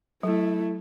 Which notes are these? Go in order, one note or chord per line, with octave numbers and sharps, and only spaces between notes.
F#3 A3 E4